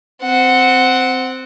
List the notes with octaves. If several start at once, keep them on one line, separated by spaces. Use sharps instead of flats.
C4 F#5